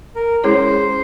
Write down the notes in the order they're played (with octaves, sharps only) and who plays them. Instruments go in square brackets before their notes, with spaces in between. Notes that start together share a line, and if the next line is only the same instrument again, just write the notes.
[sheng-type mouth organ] A#4
[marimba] G#3 C#4 E4 G#4 C#5 [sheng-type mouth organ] C5